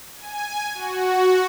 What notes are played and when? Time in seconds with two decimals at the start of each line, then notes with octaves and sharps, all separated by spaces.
0.17 G#5
0.74 F#4